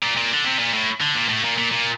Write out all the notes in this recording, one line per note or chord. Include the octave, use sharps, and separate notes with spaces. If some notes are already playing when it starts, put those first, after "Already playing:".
A#2
A#2
D3
C3
A#2
A2
D3
A#2
A2
A#2
A#2
A#2